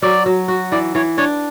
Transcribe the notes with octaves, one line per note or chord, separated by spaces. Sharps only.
F#3 D5
F#3
F#4
E3 D5
E3 C#5
D4 C#5